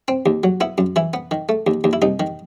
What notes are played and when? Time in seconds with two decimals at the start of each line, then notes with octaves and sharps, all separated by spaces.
0.08 C4
0.26 D#2
0.44 F#3
0.61 B3 E4
0.78 F#2
0.96 E3 E4
1.14 B3
1.31 D#3
1.49 A3
1.67 D#2
1.84 D#2
1.93 E4
2.02 C2 D#4
2.20 D#3